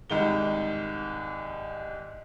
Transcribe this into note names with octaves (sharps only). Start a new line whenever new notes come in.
C2 G#2 D#3 G7